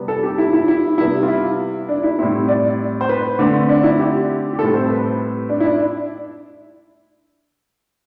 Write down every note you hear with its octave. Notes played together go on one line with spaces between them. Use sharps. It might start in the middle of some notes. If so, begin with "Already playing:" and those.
Already playing: C3 G3 B3
A4
G4
E4
E4
E4
C3 G3 B3 E4
F4
E4
D4
E4
A2 G3 C4 E4
D5
C5
B4
D3 A3 C4
D4
E4
G4
G4
A2 G3 C4 A4
C5
B4
D4
E4
D4